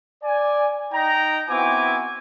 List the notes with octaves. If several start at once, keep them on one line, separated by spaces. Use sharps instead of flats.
D5 G#5
D#4 G5 A#5
B3 C4 E4 F#4 G#5 D6